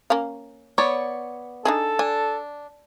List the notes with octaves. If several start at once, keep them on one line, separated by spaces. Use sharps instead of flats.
A#3 C#4 F5
B3 C#5 D5
D4 D#4 G#4 A4
D4 G#5